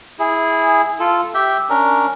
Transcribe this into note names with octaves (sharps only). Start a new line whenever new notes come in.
E4 G#4
F4 A4
G4 E5 G5
C#4 D4 A#4